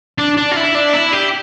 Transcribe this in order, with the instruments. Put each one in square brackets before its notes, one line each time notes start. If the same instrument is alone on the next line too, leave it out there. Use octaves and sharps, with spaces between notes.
[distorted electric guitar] D4
D4
F4
E4
D4
E4
G4